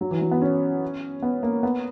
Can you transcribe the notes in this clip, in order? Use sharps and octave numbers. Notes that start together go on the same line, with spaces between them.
F#3
E3
F#3
B3
C#4
B3
A#3
B3